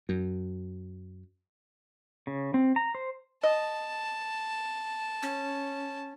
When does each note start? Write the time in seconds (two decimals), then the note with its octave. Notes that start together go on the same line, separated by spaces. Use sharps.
0.09 F#2
2.27 C#3
2.54 C4
2.76 A#5
2.95 C5
3.43 D#5 A5
5.22 C#4